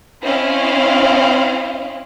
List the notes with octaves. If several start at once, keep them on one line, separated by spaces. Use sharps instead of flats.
C4 C#4 E4 D#5 F5